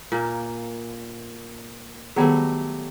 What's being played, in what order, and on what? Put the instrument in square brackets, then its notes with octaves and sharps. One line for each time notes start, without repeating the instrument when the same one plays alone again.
[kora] A#2 A#3
[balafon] D#3 B3 G#4 [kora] F#3 G3 A3